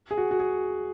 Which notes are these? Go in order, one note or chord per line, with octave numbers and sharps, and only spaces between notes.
G#4
F#4
F#4
G#4